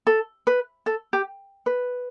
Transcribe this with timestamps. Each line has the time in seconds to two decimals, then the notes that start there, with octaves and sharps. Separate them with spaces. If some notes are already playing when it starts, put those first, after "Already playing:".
0.07 A4
0.47 B4
0.86 A4
1.13 G4
1.66 B4